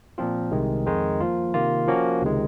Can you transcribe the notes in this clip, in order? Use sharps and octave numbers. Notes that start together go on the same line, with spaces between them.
A#2 F3 C4 F4
C2 C3 D#3 G#3
F2 D#3 G#3 D#4
F3 A#3 F4
C3 D#3 A#3 F4
F3 A#3 C#4 F#4
C#2 C3 D#3 G#3